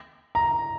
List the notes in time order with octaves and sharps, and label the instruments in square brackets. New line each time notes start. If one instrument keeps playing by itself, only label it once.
[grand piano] A#5